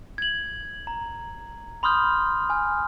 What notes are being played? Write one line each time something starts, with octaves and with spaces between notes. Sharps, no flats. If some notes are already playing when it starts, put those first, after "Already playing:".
G#6 F#7
A#5
B5 C6 D#6 F6 G6
G#5 F6